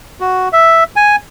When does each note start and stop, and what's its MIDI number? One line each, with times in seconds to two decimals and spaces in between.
0.21 0.49 66
0.53 0.84 76
0.96 1.16 80